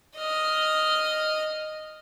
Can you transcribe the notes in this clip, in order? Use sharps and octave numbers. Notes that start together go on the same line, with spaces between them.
D#5 F6